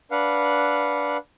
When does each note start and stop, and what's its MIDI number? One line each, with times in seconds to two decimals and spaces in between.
0.11 1.17 62
0.11 1.17 71
0.11 1.17 77
0.11 1.17 78